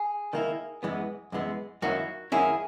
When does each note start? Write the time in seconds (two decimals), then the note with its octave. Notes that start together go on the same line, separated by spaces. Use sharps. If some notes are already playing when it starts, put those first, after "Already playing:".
Already playing: G#4
0.33 D#3 A#3 E4
0.83 F#2 E3 G#3 B3
1.32 F#2 E3 G#3 B3
1.82 F#2 D#3 A#3 C#4 E4 F#4
2.32 F#2 D#3 A#3 C#4 E4 G#4